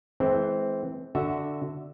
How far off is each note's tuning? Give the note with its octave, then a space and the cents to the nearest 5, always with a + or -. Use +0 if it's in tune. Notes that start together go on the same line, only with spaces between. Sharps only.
E3 +0 G#3 +45 C4 +0
D3 +0 F#4 +0 E5 -10